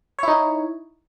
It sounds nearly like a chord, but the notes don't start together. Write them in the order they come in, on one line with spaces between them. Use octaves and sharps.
C#5 E4 D#4